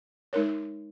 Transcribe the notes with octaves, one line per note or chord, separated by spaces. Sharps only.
G#3 D#4 A#4 C#5